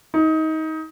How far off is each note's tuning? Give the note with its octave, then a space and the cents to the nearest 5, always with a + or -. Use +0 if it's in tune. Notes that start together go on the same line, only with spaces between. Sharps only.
D#4 +25